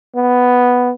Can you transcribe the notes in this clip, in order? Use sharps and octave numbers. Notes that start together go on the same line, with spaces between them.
B3